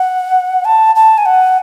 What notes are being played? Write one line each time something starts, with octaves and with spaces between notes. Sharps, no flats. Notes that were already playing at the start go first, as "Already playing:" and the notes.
Already playing: F#5
A5
A5
G#5
F#5